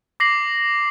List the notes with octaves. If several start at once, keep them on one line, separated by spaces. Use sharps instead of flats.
D6 A#6 C7 F#7